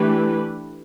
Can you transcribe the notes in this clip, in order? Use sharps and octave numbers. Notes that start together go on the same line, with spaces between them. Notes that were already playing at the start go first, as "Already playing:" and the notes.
Already playing: E3 A3 D4 G4 B4